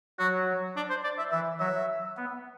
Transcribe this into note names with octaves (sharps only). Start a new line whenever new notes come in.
F#3 F#4
D4
C5
D5
E5
E3 E5
F#3 E5
B3